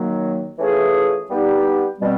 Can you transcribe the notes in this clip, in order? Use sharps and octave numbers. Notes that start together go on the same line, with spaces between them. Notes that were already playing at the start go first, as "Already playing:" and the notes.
Already playing: D#3 F#3 A#3
E3 A3 C#4 F4 G#4
G3 B3 D#4 G4
B2 G3 C4